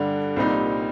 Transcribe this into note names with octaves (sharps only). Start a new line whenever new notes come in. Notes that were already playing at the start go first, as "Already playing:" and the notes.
Already playing: G2 D3 G3 D4
C2 A#2 G3 C4 D#4